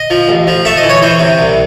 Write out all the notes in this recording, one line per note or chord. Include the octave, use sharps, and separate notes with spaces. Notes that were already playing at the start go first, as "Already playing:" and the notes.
Already playing: D#5
F3
A1
F3
A3 E5
D#5
E3
C#5
E3 C5
C3
C2